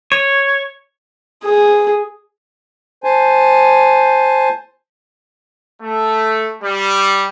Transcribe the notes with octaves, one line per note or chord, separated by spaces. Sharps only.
C#5
G#4
C5 G#5 A5
A3
G3